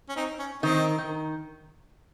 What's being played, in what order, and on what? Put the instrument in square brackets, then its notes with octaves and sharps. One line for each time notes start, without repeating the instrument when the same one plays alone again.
[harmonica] C#4
C4 D#4
C#4
[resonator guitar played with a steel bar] D#3 [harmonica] C4 D#4
[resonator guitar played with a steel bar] D#3